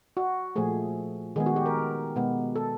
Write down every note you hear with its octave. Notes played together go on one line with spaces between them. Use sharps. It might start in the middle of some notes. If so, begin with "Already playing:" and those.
F#4
A#2 F3 A3 G#4
D#3 G#3 B3 G#4
F#4
G4
A#4
B2 G#3 B3
A4